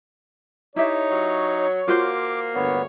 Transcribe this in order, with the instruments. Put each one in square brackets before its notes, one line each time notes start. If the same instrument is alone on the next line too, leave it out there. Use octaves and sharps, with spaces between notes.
[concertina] D#4 [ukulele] E4 G4 E5 [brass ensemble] C#5
[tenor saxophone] F#3
[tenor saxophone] A#3 [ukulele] F4 F#4 C5 [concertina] D6
[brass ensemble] G1 D2 C#5 [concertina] B3